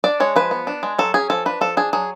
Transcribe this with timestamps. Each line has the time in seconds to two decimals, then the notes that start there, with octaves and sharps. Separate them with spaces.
0.04 D4 D5
0.20 G#3 C#5
0.36 F3 B4
0.51 B3
0.67 D4
0.83 G#3
0.98 F#3 A4
1.14 C#4 G#4
1.30 F3 A4
1.46 D4 B4
1.61 F3 A4
1.77 D4 G#4
1.93 F#3 G#4